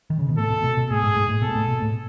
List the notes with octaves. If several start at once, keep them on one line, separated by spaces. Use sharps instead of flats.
D#3
C#3
B2
A2 A4
B2
B2
B2
A2 G#4
G#2
G#2
A2
B2 A4
A2
B2
A2